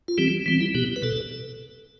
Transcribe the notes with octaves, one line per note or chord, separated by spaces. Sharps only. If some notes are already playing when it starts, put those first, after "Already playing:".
F4
E3 G3 C4 G4
E3 G3 C4
E4
B2 B3 G4
B4
B2 A4